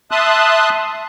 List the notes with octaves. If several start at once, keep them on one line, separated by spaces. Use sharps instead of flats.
E5 A5 C6 D#6 F#6